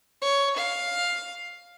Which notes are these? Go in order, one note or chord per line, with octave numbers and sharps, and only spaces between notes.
C#5
F5